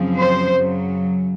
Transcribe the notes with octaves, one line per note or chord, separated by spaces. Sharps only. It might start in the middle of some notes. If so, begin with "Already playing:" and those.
Already playing: F#2 C#3 F3 C4
C5
F#2 C#3 F#3